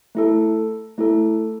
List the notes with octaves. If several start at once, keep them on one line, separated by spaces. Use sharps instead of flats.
A3 E4 A4
A3 E4 A4